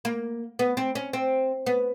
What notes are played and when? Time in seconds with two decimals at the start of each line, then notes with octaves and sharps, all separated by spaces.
0.05 A#3
0.59 B3
0.77 C4
0.95 C#4
1.13 C4
1.66 B3